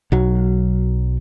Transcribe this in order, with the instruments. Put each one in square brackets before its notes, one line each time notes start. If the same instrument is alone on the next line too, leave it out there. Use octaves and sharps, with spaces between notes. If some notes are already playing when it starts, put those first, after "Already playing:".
[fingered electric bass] B1 F#3